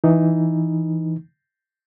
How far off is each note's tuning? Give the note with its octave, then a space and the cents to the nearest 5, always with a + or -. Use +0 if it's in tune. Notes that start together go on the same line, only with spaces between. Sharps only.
E3 +0 D#4 +0